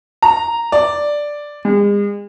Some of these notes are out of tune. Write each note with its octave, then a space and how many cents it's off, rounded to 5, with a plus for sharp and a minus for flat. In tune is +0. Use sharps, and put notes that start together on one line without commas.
A#5 -5
D5 +0
G#3 -40